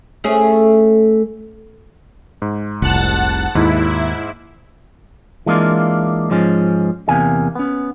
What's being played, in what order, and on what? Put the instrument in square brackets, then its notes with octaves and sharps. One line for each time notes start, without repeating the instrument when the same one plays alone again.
[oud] A3 C#4 G#4
[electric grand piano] G#2
[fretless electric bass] F1 C2 [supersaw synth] F#5 A5 F#6
[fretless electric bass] D#2 [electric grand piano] G#2 [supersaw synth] E4
[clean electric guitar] E3 G#3 A#3 D4 F4
G#2 F3 G#3 C#4
E2 C3 A#3 G#5
B3 C#4